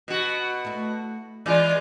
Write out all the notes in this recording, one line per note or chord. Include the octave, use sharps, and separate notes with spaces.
B2 F#4
A3 E4
E3 G#3 F4 D5